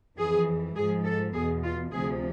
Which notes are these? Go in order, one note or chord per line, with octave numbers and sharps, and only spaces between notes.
F2 E3 G#4
G#2 F3 G#4
A4
E2 B2 G#4
F4
D2 C3 F3 G#4